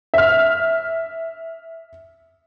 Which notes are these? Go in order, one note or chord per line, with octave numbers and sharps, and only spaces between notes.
E5 F6